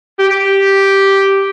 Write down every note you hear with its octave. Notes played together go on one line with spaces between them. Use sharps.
G4